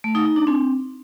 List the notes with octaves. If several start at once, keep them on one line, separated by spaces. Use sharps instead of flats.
A3
D#4
D#4
D4
C4